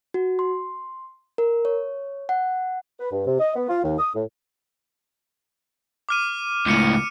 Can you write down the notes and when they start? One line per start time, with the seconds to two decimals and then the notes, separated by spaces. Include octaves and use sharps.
0.14 F#4
0.39 C6
1.38 A#4
1.65 C#5
2.29 F#5
2.99 B4
3.12 G2
3.26 C3
3.40 D#5
3.56 B3
3.69 F4
3.83 D#2
3.99 D#6
4.15 A2
6.09 D6 F6 D#7
6.66 C#2 A2 F6 C#7 D#7